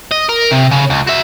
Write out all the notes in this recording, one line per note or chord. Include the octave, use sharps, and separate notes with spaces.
D#5
A#4
C3
C#3
C#2
F#4 E5